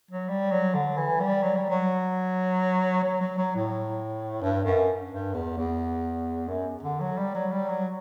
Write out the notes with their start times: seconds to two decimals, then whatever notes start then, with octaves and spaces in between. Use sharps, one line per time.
0.11 F#3
0.29 G3
0.51 F#3
0.74 D3
0.97 E3
1.20 G3
1.43 F#3
1.56 G3
1.70 F#3
3.04 F#3
3.21 F#3
3.38 F#3
3.56 A2
4.42 G2
4.65 F#2
5.11 G2
5.34 E2
5.57 E2
6.48 F#2
6.83 D3
7.01 F#3
7.18 G3
7.35 F#3
7.52 G3
7.69 F#3